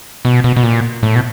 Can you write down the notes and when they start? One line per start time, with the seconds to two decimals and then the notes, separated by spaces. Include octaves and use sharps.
0.25 B2
0.44 B2
0.56 B2
0.63 A#2
1.03 A2
1.15 B2